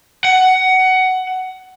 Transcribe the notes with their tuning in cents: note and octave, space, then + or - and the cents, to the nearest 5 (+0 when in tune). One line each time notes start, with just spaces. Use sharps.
F#5 +15